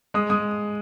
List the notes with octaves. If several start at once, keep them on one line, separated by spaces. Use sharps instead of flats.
G#3 D#6
G#3 D#6